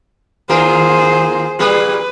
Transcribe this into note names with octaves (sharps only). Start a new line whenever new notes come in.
D#2 F4 G#4 A#4 C5
A#2 G3 G#4 B4